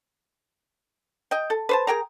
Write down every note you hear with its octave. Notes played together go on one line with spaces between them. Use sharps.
D#5 G5
A4
B4 C5 A5
G#4 A#4 G5 A#5